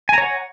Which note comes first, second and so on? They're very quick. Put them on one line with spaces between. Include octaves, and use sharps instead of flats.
G#5 A#5 C#5 F#5